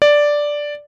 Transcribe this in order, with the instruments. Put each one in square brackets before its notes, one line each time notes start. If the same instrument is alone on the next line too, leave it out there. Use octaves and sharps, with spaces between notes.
[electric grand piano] D5